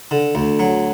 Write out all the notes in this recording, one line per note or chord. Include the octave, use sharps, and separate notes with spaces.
D3
D2
F#3